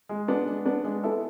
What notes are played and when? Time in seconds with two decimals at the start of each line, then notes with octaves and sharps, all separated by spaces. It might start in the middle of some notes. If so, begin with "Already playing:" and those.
0.09 G#3
0.28 B3 D4
0.47 G#3
0.65 B3 D4
0.84 G#3
1.04 B3 E4 A4